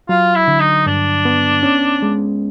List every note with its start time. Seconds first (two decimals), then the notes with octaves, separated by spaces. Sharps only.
0.09 F#3 F4
0.35 E4
0.48 D3
0.60 D#4
0.86 G2 D4
1.25 B3
1.63 C#4
2.02 G#3